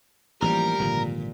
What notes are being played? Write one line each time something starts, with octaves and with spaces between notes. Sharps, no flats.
A1 E3 F3 G3 A#3 A#4
G#1 A#2 D3 F3